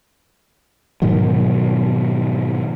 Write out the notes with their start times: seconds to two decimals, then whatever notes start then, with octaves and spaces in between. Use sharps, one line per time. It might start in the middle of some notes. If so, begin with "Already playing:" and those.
1.02 G#2 B2 D#3 F#3